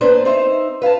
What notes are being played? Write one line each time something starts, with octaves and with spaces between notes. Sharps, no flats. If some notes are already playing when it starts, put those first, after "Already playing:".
A#3 C4 D4 B4 C5
C4 D#4 C5 E5
B4 F5 G5 A5